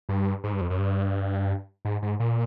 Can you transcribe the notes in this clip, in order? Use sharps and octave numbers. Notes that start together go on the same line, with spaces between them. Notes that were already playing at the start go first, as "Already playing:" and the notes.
G2
G#2
G2
F2
F#2
G2
G#2
G#2
A#2